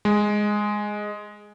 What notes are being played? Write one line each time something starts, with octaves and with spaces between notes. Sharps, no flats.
G#3